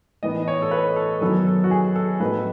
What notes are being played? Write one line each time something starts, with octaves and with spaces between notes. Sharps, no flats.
A2 E3 B3 D#4 D#5
C#5
A4
B4
A4
F#2 D#3 F#3 B3 A4
A4
F#4
G#4
A4
A2 F#3 B3 D#4 B4